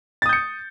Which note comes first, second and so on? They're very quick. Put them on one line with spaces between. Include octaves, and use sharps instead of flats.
A6 D#6 G6 C#7